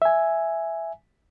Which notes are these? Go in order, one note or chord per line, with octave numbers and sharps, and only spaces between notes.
E5 G#5